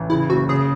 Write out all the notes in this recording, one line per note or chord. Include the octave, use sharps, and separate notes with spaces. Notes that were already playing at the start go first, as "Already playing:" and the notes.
Already playing: A1
C#3 E4
F#1 F#4
C#3 G#4